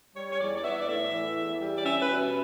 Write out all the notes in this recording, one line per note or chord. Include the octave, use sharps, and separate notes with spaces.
G3 C#5
C#5
E2 D5
D5
B3 E5
D5
A2 E5
E3
E2
G3
D5
C#4 E5
B4
B2